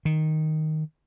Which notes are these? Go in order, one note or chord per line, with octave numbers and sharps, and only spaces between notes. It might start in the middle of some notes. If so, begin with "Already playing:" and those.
D#3